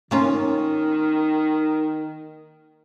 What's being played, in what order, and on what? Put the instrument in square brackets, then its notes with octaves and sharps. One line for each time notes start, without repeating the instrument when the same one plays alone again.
[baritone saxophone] D#3 [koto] A#3 C#4 F4